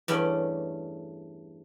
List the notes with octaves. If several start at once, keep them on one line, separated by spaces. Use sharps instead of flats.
E2 G2 A3 C#4 D5